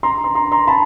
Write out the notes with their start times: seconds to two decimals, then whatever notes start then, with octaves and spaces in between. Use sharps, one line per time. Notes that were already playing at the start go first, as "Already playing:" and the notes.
0.03 A#5 C6
0.24 A#5 C6
0.35 A#5 C6
0.52 A#5 C6
0.68 A5 B5